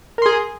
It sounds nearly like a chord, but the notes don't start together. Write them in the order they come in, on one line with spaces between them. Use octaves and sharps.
A#4 C6 G#4